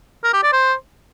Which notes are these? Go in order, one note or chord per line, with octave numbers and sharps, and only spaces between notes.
A#4
G4
D5
C5